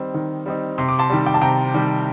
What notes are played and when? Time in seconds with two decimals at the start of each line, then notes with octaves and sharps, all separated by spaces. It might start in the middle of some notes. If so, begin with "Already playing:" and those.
Already playing: D#3 G3 C4 D#4
0.14 D#3
0.46 G3 C4 D#4
0.78 C3 C6
0.89 D6
0.99 A5 C6
1.10 D#3 G3
1.26 G5
1.34 A5
1.42 C3 G5 A#5
1.74 D#3 G3